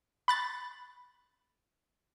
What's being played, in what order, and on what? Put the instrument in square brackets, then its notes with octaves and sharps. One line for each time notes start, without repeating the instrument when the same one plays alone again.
[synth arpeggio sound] B5 F#6 A6